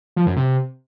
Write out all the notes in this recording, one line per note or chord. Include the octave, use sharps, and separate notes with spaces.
F3
F#2
C3